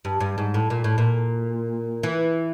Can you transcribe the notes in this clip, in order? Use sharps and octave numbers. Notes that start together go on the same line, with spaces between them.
G2
G2
G#2
A2
A#2
A2
A#2
E3